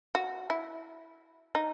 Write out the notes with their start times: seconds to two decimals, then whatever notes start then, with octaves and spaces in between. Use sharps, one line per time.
0.15 F#4
0.50 E4
1.55 D#4